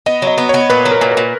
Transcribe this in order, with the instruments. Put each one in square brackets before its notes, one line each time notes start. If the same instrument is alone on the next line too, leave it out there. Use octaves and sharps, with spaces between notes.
[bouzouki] B3 [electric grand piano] D#5
[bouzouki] F#3
[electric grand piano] D#5
[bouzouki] B3
[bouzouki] B3 [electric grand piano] C#5
[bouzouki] A#2 [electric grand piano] B4
[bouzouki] F#3
[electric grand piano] A#4
[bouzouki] A#2
[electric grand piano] A#4
[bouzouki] A#2